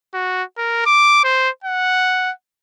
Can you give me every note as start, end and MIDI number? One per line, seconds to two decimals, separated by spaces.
0.14 0.43 66
0.58 0.83 70
0.86 1.22 86
1.24 1.50 72
1.64 2.32 78